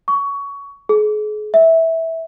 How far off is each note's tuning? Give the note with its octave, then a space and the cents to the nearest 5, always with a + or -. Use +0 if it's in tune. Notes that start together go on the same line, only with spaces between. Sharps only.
C#6 +20
G#4 +35
E5 -15